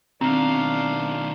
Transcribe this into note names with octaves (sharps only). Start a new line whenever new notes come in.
B2 D#3 C4 D4 F5 A#5